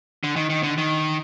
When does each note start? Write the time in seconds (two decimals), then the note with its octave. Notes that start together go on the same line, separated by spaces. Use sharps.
0.24 D3
0.36 D#3
0.50 D#3
0.63 D3
0.78 D#3